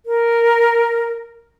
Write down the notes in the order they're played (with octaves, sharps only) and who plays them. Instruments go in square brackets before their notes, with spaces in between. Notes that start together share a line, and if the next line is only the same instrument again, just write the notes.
[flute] A#4